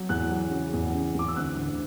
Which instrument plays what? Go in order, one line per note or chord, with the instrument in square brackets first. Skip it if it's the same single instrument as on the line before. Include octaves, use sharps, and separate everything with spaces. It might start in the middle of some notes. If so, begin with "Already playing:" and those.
Already playing: [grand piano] F#3
E2 F#6
F#3
C#3
E2
C#3
E2 D6
E6
D2 F#6
D2